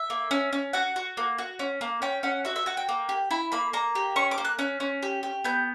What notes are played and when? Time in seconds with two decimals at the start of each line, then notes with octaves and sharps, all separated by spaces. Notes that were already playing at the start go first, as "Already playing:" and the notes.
Already playing: E5
0.10 A#3
0.31 C#4
0.53 C#4
0.73 F#4 F#5
0.96 F#4
1.17 A#3
1.38 F#4
1.59 C#4
1.81 A#3
2.02 C#4 G5
2.23 C#4 F#5
2.45 F#4 E5
2.56 E5
2.66 F#4 F#5
2.77 G5
2.89 A#3
3.09 G4
3.31 E4 B5
3.52 A#3 B5
3.73 A#3 A#5
3.95 G4
4.16 C#4 C#6
4.31 D6
4.38 A#3
4.45 F#6
4.59 C#4 F#6
4.80 C#4
5.03 G4
5.23 G4
5.44 B3 G6